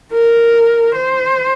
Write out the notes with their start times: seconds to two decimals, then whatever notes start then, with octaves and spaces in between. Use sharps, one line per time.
0.12 A#4
0.95 C5